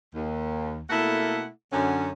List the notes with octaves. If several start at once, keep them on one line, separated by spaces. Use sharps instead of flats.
D#2
B2 A3 A#3 E4 A4 F#5
F#2 D3 C#4